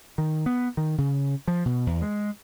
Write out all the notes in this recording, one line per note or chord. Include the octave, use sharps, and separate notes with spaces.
D#3
B3
D#3
C#3
F3
B2
E2
G#3